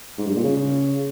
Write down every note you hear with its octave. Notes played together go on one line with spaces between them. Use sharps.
G#2
G2
A#2
C#3